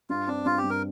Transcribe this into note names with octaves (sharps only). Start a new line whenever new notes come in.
G2 F4
C4 D4
G2 F4
G4
G2
A#4